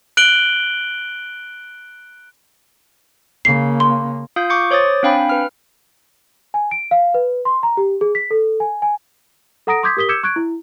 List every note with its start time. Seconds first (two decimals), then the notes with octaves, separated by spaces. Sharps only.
0.17 F#6 D7 F#7 G7
3.45 C#3 A#3 C7
3.80 C6
4.36 F4 F5 D#6 G6
4.50 C#6 D6 G6 C#7
4.71 C5 C#5 D6 D#6 A6
5.03 C4 D4 F5 G5 G#5 B5
5.29 B4 F6
6.54 G#5
6.71 D7
6.91 F5
7.14 B4
7.45 C6
7.63 A#5
7.77 G4
8.01 G#4
8.15 B6
8.31 A4
8.60 G#5
8.82 G#5
9.67 A4 F#5 A#5 D#6 A#6 D7
9.83 C6 D6 D#6 G6 G#6 B6
9.97 G4 A#4 D#6 B6 G7
10.09 D6 E6 G6 G#6 C#7 E7
10.23 C#6 F#6 G#6 D7
10.36 E4